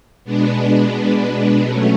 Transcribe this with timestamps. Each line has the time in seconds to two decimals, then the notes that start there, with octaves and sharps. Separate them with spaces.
0.24 B2 G#3 B3 D4
1.61 B2 F#3 A3 C#4